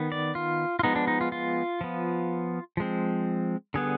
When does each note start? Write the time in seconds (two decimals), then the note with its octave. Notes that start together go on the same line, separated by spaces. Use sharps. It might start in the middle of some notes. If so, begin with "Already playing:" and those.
Already playing: D#3 B3
0.12 D5
0.35 F4
0.79 F4
0.83 F3 G#3 B3 D#4
0.96 D4
1.08 D#4
1.21 F4
1.32 F4
1.81 F3 B3
2.77 F3 G#3 C4
3.74 D3 G3 B3 G#4